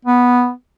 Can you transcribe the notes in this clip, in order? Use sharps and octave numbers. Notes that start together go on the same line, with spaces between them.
B3